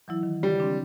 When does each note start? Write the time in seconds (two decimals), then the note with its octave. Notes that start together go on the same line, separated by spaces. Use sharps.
0.08 E3 F#3 E4
0.23 D#3
0.43 C#3 G3
0.60 C4 D4